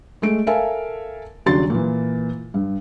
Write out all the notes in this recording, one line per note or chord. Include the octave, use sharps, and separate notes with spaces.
G#3 A3 D7
A4 A#4 E5 F5 G#5 A5
D#1 C#3 F#3 D4 C6 A6
A#2 E3
G2